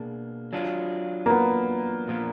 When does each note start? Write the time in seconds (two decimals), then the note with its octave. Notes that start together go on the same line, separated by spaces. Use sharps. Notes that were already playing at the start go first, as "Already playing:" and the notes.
Already playing: B2 A#3 D4 G#4
0.53 F#3 D4 F4
1.26 A#3
1.30 B3
2.08 A#2 F3 A#3